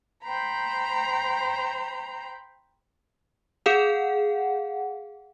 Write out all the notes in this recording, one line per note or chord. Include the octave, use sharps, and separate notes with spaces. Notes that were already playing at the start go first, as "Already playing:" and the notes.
C5 G5 A#5 B5
G#4 F5 F#5